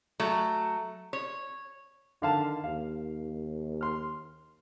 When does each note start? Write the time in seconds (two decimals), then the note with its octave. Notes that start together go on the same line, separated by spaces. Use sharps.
0.20 F#3 A3
1.13 C#5
2.22 D3 D#3 F5 A5
2.64 D#2 F5
3.81 C6 F6